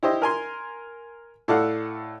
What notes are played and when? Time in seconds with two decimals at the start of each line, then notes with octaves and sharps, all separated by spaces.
0.03 E4 G4 C5 D#5
0.22 A#4 G#5 C6
1.48 A2 A4 D5 F5 F#5